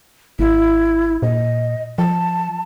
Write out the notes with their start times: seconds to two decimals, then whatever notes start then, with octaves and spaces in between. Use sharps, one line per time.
0.39 G#1 E4
1.22 A#2 D#5
1.98 F3 A5